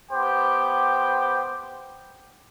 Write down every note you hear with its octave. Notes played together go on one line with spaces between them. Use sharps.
B3 G4 C5 G5